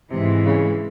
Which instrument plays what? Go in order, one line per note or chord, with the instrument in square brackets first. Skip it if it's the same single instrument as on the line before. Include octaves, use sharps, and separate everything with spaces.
[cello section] G#2 E3 G#3 [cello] C3
[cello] C#3